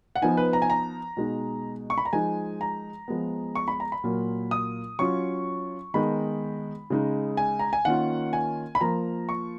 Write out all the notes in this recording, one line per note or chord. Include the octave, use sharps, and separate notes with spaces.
F#5
F3 B3 D#4 G#5
B4
A#5
G#5
A#5
B2 G#3 D#4
C#6
B5
A#5
F3 G#3 D#4 G#5
A#5
F3 G#3 B3
C#6
B5
A#5
B5
A#2 F#3 A#3 F4
D#6
F#3 C#4 F4 C#6
D#3 G#3 B3 D#4 B5
C#3 G#3 D#4
G#5
A#5
G#5
D#3 A#3 C#4 F4 F#5
G#5
B5
F3 A#3 F4 A#5
C#6